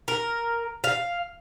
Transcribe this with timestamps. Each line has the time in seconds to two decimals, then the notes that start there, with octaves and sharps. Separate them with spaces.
0.08 A#4
0.84 F5